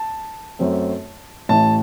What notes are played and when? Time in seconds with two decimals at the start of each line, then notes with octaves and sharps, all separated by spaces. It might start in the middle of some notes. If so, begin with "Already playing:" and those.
Already playing: A5
0.59 F#2 F#3 A3 C4
1.49 A1 A2 E3 A5